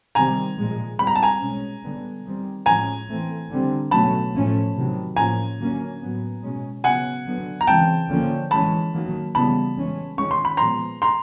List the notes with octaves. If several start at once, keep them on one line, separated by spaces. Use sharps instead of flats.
C3 D#3 G3 C4 G#5 A#5
A#2 F3 G#3
A#2 G3 C4 B5
A#5
A5
G#5 A#5
B2 G#3 C#4
D3 G3 B3
D#3 G3 C4
A2 F3 G#3 C#4 G#5 A#5
E3 A3 C4
D3 G3 C4
B2 F#3 A3 C#4 A5 B5
A2 F3 A3 C#4
C3 D#3 F#3
A2 F3 A#3 C#4 G#5 A#5
D3 F#3 A#3 C#4
A2 F#3 B3
B2 G#3 C#4
C#3 F#3 B3 F#5 G#5
D3 F#3 B3
A#5
C#3 E3 G#3 C4 G5 A5
D3 F3 A#3 C#4
E3 G#3 C#4 A5 B5
D#3 F#3 A#3
C#3 E3 G3 B3 A5 B5
E3 G#3 C#4
D#3 G#3 C#4 C#6
C6
B5
A#2 F3 G#3 B3 A#5 C6
A#5 C6